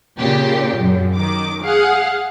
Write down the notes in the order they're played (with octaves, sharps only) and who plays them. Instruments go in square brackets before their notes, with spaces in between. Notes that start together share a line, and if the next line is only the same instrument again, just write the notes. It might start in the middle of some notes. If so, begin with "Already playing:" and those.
[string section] A#2 C#3 G4
F#2
D#3 D6
G#4 F5 F#5